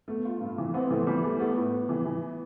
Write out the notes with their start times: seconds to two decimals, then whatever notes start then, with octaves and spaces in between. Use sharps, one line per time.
0.08 A3 B3
0.25 F4
0.41 G2
0.58 E3
0.74 B3 C4
0.90 E3 A3
1.07 E3 G3
1.23 G3 A3
1.40 A3 B3
1.57 A2
1.73 A2
1.89 E3
2.05 E3